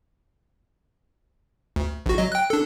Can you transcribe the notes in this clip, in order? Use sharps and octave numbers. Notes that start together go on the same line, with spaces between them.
D2
A#1 F#4
F#3 D#5
G5 F#6
D4 A4